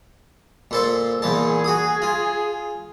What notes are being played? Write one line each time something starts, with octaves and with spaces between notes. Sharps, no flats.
A#2 A4 C5
E2 A#2 G#4 A5
F#4 D#6
F4